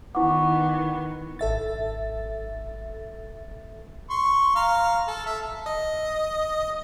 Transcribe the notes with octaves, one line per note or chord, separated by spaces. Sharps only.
D#3 B3 E4 F#5 C#6 D6
G#1 A4 E5 A6
C6 C#6
F5 A#5 F6
A4
E5 A5
D#5